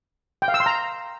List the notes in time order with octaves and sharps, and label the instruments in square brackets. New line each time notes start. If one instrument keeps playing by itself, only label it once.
[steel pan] G5
F5
E6
C6
A#5